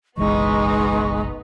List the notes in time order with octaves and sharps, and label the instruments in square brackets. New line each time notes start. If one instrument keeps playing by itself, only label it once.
[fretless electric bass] F#1 B1 E3 [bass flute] G#3 [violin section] B3 D#4 B4 [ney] C#6